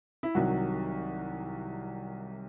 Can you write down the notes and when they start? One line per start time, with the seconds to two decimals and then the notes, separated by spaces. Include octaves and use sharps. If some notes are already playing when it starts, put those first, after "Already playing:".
0.23 E4
0.35 C2 C3 D#3 F#3 F#4